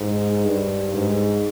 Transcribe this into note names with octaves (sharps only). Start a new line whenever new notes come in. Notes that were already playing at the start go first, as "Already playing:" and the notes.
Already playing: G#2
G2
G#2